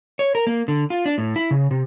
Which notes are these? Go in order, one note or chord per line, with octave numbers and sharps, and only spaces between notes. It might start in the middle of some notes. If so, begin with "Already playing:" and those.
C#5
A#4
A#3
D3
F4
D4
A2
E4
C#3
C3